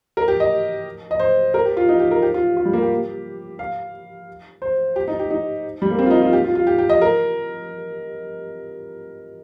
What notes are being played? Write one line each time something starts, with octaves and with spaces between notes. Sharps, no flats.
A#4
G4
D#5
D#5
C5
A#4
G4
F4
D#4
G4
A#4
G4
F4
F4
G3
A#3
G4
F5
C5
G4
D#4
G4
D#4
G3
A#3
C4
F4
D#4
F4
G4
F4
F4
G4
G4
D#5
A#4